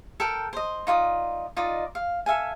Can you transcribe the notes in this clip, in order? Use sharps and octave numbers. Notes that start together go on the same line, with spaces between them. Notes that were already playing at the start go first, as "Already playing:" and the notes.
A4 A#4 G5
C5 D#5
D#4 F4 D5 D#6
D#4 F4 D5 D#5
F5
A4 E5 F5 G#5